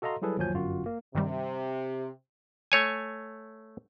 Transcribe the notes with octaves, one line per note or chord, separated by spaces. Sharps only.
F#4 A4 D#5 F5 A#5 C6
F#3 G3 E4 G#4 A4 B4
G1 D#2 F3 F#3 G#5 G6
G1 F#2 F4 F#4
A#3
G2 C3 D#3 G3
A3 C#5 G#5